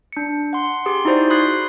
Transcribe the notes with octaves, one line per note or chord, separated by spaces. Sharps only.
D4 C#7
F#5 C6
G4 G#4 C6
D#4 E4 F#4 G#4 C5 D5
B5 C6 D#6 F#6 G#6 C7